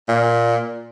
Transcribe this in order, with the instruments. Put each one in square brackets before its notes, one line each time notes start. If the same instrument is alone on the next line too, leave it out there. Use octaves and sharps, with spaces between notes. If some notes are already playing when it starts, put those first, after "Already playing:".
[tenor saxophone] A#2